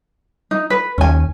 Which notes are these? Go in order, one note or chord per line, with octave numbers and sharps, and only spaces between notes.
D#4
B4
D#2 C#4 G#5